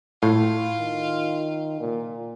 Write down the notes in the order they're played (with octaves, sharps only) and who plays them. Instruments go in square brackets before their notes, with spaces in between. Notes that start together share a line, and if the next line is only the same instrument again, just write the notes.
[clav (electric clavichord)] A2 [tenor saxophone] F4
[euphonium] D#3
A#2